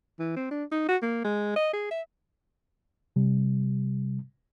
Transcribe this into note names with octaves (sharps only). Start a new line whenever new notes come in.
E3
C4
D4
D#4
F#4
A#3
G#3
D#5
G#4
E5
C3 G3